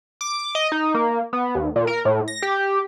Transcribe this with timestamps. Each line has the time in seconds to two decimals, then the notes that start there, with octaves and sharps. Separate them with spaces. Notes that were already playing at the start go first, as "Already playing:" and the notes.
0.21 D6
0.55 D#5
0.72 D#4
0.94 A#3
1.33 B3
1.55 D#2
1.76 A#2
1.87 A#4
2.05 A2
2.28 A#6
2.42 G4